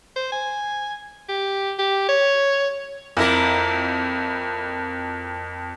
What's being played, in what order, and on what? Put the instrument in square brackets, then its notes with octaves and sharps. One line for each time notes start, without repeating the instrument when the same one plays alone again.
[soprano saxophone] C5
G#5
G4
G4
C#5
[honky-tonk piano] F2 [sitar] A#3 E4 A#4